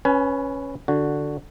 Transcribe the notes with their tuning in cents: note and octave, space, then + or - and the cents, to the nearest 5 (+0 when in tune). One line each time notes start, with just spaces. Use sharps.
C#4 -5 B4 +0 G#5 +35
D3 +0 F#4 +0